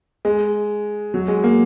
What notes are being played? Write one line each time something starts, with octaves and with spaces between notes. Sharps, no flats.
G#3
F#3
G#3
A#3